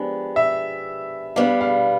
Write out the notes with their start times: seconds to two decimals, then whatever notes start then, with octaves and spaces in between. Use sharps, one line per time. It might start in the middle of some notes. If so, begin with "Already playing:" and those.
Already playing: F3 G#3 B3 D4 G4
0.36 E5
1.36 G3 B3 D4 F5
1.61 F5